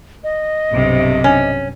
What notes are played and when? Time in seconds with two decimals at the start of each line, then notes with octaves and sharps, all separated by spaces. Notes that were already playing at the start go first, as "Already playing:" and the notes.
0.24 D#5
0.70 B1 G2 C3
1.24 C#4